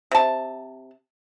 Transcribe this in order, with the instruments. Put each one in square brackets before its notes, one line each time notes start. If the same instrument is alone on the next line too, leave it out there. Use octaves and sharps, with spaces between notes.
[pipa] C3 A5